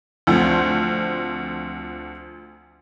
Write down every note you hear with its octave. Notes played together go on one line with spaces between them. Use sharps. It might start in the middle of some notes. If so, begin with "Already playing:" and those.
D2 F3 A3 C4